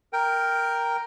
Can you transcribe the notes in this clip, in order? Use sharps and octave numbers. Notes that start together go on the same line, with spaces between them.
A#4 G5